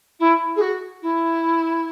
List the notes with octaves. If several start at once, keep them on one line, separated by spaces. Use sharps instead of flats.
E4
G#4
F#4
E4